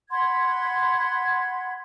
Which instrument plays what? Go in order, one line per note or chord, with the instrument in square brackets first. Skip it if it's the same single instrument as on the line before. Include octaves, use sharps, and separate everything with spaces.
[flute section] F#5 B5 C6 G#6